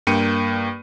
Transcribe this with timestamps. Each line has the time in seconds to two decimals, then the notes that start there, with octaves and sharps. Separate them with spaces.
0.07 G2 A#3 G5 C#7 D#7